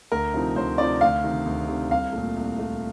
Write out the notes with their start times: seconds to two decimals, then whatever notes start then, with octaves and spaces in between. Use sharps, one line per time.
0.12 D2 A#4
0.34 C3 F3 C4 D#4
0.56 D2 C5
0.78 C3 F3 C4 D#4 D5
1.01 D2 F5
1.24 C3 D#3
1.46 D2
1.68 C3 D#3
1.91 C2 F5
2.13 A#2 A3
2.36 C2
2.59 A#2 A3